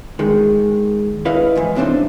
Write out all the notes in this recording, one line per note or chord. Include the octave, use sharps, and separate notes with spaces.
D#3 G#3
E4 B4 D#5 F5
F2 G#2 E3
C2 A2 C4 D4 D#4 C5